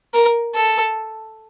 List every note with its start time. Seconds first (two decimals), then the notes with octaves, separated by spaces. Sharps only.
0.14 A#4
0.55 A4